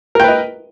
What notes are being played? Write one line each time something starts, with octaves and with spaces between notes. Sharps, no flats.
A#4 B4 D#5 G5